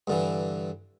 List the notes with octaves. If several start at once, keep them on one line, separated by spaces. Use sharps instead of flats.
G2 D3 E3